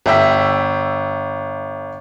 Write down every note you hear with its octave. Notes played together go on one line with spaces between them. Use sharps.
G1 E5 G5 E6 B6